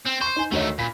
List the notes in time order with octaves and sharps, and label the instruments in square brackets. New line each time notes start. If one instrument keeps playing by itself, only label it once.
[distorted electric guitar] C4
[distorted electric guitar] C5 [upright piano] C#6 C7
[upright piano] D#4 G#5
[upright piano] D2 C#5 D#5 [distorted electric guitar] D#3 A3
[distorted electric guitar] A#2 [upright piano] B5 B6